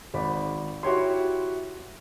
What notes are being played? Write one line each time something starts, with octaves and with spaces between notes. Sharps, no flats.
G#1 D5 B5
E4 F#4 G4 C#5 C6